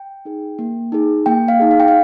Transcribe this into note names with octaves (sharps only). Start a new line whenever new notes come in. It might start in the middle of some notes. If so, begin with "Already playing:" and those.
Already playing: G5
D#4 G#4
A#3
D#4 G#4
A#3 G5
F5
D#4 G#4
F5
G5
F5